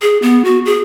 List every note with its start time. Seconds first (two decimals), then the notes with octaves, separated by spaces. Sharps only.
0.02 G#4
0.22 B3
0.45 F#4
0.66 G#4